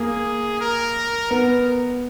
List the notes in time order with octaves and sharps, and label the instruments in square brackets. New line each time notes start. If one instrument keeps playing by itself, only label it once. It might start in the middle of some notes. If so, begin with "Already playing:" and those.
Already playing: [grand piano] A#3 [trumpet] G#4
[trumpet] A#4
[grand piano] B3 [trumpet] A#4